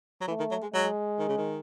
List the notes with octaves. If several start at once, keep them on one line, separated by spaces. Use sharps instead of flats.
F#3
E3 A3
D#3
F#3
G#3
F#3 G#3
D#3
C#3
D#3